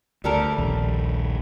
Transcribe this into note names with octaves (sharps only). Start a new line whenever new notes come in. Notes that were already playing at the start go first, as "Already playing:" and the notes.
D2 G3 A4 A#4
A#1 D#2